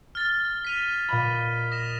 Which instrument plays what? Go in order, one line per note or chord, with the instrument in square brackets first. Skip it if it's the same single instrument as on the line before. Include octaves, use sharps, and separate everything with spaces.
[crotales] F6 A6 G7
B6 D#7 F7
[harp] A#2 D#5 B5
[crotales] D#6 A#6 E7